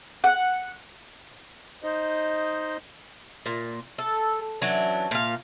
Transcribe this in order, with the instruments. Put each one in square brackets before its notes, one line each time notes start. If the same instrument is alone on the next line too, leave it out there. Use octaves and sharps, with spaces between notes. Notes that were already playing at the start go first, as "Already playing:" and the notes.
[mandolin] F#5
[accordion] D#4 C5 D#5
[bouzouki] A#2
A4
E3 F#3 C#4 D4
A#2 F5